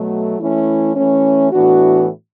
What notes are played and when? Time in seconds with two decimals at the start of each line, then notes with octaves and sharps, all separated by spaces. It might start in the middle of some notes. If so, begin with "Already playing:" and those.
Already playing: B2 F#3 A3
0.38 E3 A3 C#4 E4
0.94 E3 A3 C#4
1.51 A2 E3 B3 D4 F#4